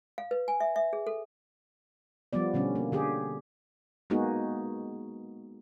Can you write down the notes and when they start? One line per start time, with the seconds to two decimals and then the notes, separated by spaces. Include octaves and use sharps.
0.18 F5
0.31 B4
0.48 G#5
0.60 E5
0.76 E5
0.93 G#4
1.07 A4
2.33 F3 G3 B3 D5
2.54 B2 D3 G3 C#4
2.75 A#3
2.92 D3 G4 G#4
4.10 G#3 A#3 B3 D#4 F#4 G#4